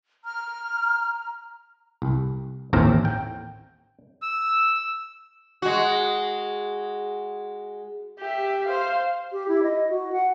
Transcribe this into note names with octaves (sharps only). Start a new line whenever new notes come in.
A#5 F6
C2
A1 D#2 A2 C4 A#4 A#5
G5
E6
G#3 F#4
G4 E5
C5 F5
G4
E4
D#5
F#4
F#5